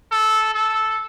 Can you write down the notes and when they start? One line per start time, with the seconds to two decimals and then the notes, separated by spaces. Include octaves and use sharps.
0.12 A4
0.54 A4